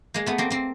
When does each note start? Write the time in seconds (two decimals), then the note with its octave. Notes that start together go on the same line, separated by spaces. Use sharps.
0.14 G#3 A#3
0.26 A3 B3
0.38 A#3 C4
0.50 A#3 C4